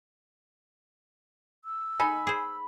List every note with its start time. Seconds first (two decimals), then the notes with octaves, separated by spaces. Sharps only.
1.65 E6
2.00 D#4 A4 G#5 B5
2.27 G#4 C5